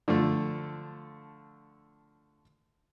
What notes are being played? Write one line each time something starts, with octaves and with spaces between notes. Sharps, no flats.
D3 F3 A3